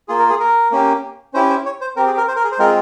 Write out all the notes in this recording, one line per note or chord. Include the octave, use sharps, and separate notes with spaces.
A#3 F4 G#4
A#4
G#4
A#4
A#3 C#4 G4
C#4 E4 G4 C5
C5
C#5
C5
C4 G4 A#4
G#4
A#4
C5
A#4
G#4
C5
G#3 C4 F4 G#4 A#4